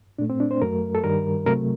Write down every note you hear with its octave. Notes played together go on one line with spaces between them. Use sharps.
A#2 A3 D4
C4
D4
C5
F#2 F#3 A3 A#4
A4
G2 D#3 G3 A#4
C3 F#3 A3 A#4